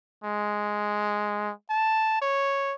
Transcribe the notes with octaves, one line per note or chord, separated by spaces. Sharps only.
G#3
A5
C#5